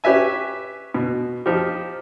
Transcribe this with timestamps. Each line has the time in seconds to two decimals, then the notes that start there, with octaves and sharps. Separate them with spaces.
0.04 C#4 G4 B4 E5 G#5
0.94 B2
1.46 F3 D#4 G4